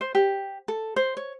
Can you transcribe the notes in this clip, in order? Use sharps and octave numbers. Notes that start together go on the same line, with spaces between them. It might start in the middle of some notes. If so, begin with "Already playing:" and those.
C5
G4
A4
C5
C#5